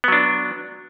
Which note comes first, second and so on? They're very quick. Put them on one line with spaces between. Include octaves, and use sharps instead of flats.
B3 F#3 D4